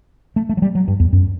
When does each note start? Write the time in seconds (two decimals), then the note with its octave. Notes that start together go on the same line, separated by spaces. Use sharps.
0.36 A3
0.49 A3
0.57 F#3
0.62 G3
0.75 F#3
0.88 G2
1.00 E2
1.13 F#2